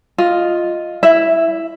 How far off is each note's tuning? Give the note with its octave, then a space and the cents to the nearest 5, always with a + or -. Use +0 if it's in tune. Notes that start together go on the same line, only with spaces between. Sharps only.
F4 +0 D#5 +0
E4 +0 E5 +0